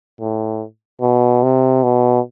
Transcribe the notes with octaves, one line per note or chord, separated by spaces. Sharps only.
A2
B2
C3
B2